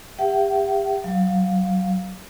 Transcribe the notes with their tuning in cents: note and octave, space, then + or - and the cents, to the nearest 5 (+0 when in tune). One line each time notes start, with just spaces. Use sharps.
G4 +30 E5 +35 G5 -45
F#3 +25 F5 +0